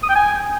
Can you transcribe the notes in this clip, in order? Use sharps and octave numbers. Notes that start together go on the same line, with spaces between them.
D#6
G5
G#5